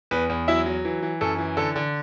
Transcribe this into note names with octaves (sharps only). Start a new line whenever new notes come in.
E2 B4
E2
F#3 E4 E5
F#3
E3
E3
F#2 A4
E3
D3 A4
D3